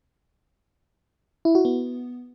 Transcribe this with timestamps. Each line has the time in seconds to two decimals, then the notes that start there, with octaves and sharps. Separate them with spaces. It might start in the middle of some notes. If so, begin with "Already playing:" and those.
1.45 E4
1.55 F#4
1.65 B3